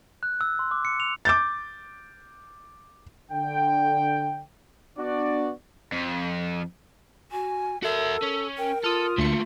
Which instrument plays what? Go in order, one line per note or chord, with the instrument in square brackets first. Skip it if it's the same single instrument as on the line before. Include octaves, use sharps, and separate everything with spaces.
[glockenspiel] F#6
E6
C6
D6
C#7
F7
[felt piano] D6 G6 A6
[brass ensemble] D3 G5
B3 D4 F#4 D5
[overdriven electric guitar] F2
[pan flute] F#4 [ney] G#5
[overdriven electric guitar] F#4 E5 [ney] A4 [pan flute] A#4
[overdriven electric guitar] C#4
[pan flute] A#4 [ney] G5
[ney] F4 [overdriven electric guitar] A4 [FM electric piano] D#6 F6
[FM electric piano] D2 C#7 [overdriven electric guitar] A3 A#3